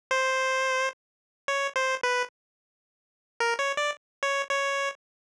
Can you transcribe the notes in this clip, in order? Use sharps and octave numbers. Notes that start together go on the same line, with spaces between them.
C5
C#5
C5
B4
A#4
C#5
D5
C#5
C#5